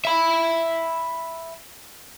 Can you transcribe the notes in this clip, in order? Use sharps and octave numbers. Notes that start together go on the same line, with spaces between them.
E5 B5